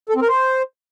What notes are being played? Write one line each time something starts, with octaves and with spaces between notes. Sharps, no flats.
A4
C4
A#4
C5